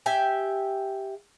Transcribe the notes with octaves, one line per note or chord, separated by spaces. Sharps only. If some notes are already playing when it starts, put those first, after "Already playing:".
G4 E5 G#5